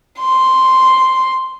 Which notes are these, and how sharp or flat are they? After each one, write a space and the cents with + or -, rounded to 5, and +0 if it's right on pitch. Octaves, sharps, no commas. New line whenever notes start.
C6 -5